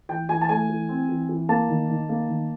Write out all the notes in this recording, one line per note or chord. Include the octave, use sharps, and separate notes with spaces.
E3 G5
E3 G#5
A5
A3 G#5
E3
C4
E3
E3
A#3 A5
D#3
D#3
A#3
D#3